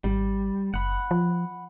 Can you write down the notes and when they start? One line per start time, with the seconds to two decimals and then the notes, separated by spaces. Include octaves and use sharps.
0.04 G#1 G3
0.74 F#1 F#5 B5
1.11 F3